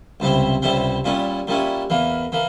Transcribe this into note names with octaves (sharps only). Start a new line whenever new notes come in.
C#2 C3 G3 C4 E4
C#2 C3 G3 C4 E4
A#2 G3 C#4 E4
A#2 G3 C#4 E4
E2 E3 A#3
E3 A#3